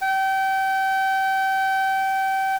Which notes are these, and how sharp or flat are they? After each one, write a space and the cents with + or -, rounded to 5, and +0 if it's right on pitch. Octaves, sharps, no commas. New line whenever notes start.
G5 -30